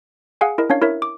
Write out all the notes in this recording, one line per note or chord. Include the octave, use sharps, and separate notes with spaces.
G#4 F5 F#5 G#5
E4 A#4 D#5
C#4 D4 C#5 F5
E4 A#4 C#5 E5
D6